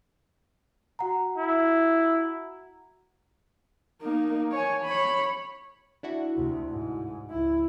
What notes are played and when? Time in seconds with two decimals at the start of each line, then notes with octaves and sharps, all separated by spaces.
0.99 F#4 F#5 A#5
1.38 E4
4.02 A#3 D#4
4.52 C#5 G#5
4.85 C#5 B5
6.03 D4 E4 F#4
6.36 D2 C3
6.69 G#2
7.30 C#2 E4